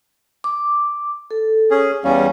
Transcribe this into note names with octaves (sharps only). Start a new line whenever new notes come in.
D6
A4
C#4 G#4
E2 G3 C#4 F5 G#5